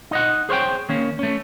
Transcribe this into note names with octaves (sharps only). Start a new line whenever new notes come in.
D#4 D#5 F#5
G#4 C5 C#5 F5 G5
D#3 A#3 C#4
A3 C#4